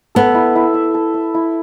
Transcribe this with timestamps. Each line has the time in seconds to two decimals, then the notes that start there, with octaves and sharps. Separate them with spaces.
0.15 B3 A4
0.35 E4
0.56 E4
0.74 E5
0.94 A4
1.14 E5
1.34 E4